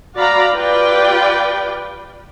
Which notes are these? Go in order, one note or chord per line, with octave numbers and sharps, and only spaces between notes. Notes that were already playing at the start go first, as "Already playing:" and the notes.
F#4 D5 F5 A#5 B5
F4 G4 B4 D5 G5